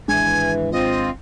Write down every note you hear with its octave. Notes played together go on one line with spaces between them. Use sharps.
G#1 E3 G#3 D4 G#5
C4 F4 D#5